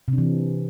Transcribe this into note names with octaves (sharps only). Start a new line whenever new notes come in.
C3
D4
E3